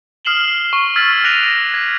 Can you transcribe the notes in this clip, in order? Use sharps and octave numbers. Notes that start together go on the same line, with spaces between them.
D#6 F6 C7 E7 F#7 G7
C#6
E6 F6 G#6 A6 B6 F#7
D6 F#6 A#6 D7 D#7 F7
G#6 B6